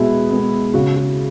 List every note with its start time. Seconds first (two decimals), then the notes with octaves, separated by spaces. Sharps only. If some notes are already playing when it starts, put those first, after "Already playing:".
Already playing: B2 G#3 B3 E4
0.30 G#3 B3
0.74 C#3 F#4
0.97 F#4